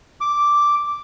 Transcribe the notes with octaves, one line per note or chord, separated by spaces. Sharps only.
D6